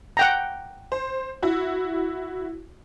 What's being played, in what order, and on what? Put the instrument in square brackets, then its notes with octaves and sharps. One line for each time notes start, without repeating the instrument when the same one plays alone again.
[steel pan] F#5 G5 A#5
[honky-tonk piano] C5
E4 F#4